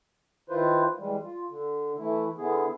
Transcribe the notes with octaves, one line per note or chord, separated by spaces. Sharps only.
D#3 E4 F4 B4 C5
E3 G3 G#3
F4
D3
E3 A3 E4
D3 B3 E4 G#4